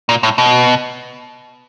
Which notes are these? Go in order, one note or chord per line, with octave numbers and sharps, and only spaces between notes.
A#2
A2
B2